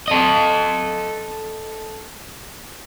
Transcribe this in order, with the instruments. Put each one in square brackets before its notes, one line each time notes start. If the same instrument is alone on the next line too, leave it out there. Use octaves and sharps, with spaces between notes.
[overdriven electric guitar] A4 D#5